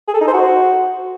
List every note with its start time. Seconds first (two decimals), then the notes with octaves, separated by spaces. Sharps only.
0.08 G#4
0.14 A4
0.21 D#4
0.27 C5
0.34 F#4